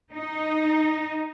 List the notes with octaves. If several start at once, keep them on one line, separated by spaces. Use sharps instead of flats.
D#4